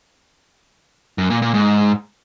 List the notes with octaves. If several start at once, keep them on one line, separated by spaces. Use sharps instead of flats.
F#2
A#2
A#2
G#2